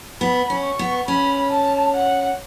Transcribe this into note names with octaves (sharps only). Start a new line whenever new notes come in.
B3 B5
C#4
C#6
B3
C#4 B5
A5
F#5